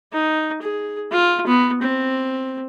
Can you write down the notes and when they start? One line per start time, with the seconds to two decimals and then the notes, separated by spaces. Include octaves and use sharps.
0.12 D#4
0.62 G#4
1.11 F4
1.47 B3
1.82 C4